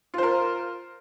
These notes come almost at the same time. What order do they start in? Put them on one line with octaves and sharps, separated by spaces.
F4 C5 A#4